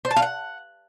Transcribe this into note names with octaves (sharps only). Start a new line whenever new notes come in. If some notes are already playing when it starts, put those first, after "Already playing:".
C5
A5
F5
F#5